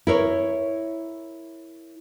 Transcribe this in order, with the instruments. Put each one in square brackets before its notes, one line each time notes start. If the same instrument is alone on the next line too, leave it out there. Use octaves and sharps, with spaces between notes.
[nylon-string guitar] E4 A#4 C#5